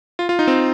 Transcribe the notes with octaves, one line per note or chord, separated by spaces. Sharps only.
F4
F4
D#4
C4